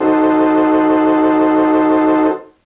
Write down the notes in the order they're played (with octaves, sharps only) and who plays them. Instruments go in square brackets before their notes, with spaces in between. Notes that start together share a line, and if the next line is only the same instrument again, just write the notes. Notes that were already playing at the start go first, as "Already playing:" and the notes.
[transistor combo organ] D#4 F#4 A4 C5